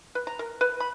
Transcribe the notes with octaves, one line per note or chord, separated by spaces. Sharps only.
B4
A#5
A#4
B4
B5